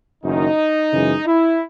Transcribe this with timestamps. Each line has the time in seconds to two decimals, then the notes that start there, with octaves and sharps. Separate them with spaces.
0.24 F#1 F#2 D#3 D#4
0.92 F#2 C#3 E3 G#3
1.25 E4